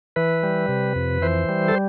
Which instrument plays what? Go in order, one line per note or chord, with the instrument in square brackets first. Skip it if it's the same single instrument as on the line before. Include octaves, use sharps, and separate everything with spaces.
[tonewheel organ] E3 B4
G3
C3
F2
E3 C5
G3
A4